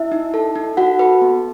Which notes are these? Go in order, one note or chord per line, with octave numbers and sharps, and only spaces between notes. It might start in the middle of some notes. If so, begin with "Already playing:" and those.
Already playing: E4 E5
D#4
A4
D#4
F#4 A4 F#5
A4 B4
B3